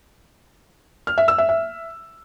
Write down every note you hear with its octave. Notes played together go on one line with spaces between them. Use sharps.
F6
E5
E6
E5
E5